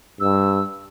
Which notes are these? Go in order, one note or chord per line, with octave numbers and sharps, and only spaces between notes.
G2 E6